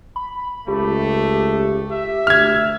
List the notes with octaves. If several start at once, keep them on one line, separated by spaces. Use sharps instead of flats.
B5
C#2 A3 G4
E5
D2 F6 G#6